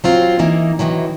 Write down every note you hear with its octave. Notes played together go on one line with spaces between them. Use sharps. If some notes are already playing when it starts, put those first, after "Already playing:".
F#3 C4 F4
E3 A#3 D#4
C3 D#3 E3 F#3